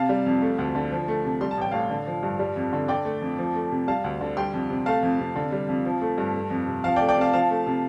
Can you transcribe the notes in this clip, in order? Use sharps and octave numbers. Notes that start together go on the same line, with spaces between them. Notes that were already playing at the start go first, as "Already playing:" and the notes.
Already playing: C3 F5 A5
G3
F2
A3
D2
D3
F3
A3
C3
G3 C6
A5
A1 G5
A2 F5 A5
D3
F3
G2
G3
F2
D3
D3 D5 G5
A3
F2
F3
A3
C3
G3 F5 A5
D2
D3
G3 G5 C6
F2
C3
A3 F5 A5
F2
C3
D3
G3
F2
F3
A3
G2
A3
F2
C3
F3 F5 A5
D5 G5
A3
D5 G5
C3 F5 A5
F3 F5 A5
A3
C3